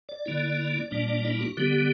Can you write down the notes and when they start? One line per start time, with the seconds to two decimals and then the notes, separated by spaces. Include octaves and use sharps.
0.09 D5
0.26 D3 A#3 E4
0.91 A#2 G3 A#3 D4 D5
1.24 E4
1.41 F#4
1.57 D3 G3 B3 G4